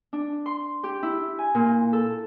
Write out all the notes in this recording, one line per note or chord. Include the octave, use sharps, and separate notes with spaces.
D4
C6
G4
E4
G#5
A#2
A4